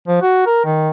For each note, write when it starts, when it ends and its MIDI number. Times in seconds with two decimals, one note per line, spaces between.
0.08 0.19 53
0.22 0.45 66
0.46 0.63 70
0.65 0.91 51